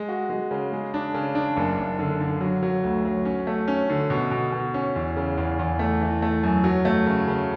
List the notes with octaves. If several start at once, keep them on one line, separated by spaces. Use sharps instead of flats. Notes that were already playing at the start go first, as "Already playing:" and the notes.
Already playing: G#3
F#4
G#3
C#3
G#3
D4
C#3
D4
F#1
F#1
D3
D3
F#3
F#3
D2
F#3
C#4
A3
C#4
D3
B2
B2
B2
C#4
E2
C#3
E2
E2
A3
E3
A3
F#2
F#3
A3
C#3
C#3